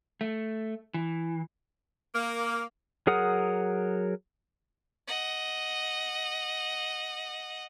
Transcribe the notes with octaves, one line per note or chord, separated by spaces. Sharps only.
A3
E3
A#3
F#3 G#4 A#4 F#5 D#6
D#5 F#5